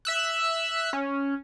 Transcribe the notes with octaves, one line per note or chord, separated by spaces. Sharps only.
E5 E6 F#6
C#4